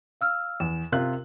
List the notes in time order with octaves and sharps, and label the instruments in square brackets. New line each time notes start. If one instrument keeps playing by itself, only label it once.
[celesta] F5 E6 F6
[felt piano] E2 [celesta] E7
[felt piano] C3 F4 F#6 [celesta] A#4